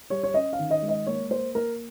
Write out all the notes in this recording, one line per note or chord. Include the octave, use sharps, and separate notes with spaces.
G3 C#5
C#5
C#4 D#5
F5
D#3
D#5
G#3
D#5
A#3 C#5
A#3 C5
A#3 A#4